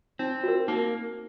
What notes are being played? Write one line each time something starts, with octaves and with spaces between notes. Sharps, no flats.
C4 D#4
F#4 A#4
A#3 D#4